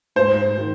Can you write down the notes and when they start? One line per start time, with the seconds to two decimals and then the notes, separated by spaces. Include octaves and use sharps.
0.16 G#2 C5
0.58 D#3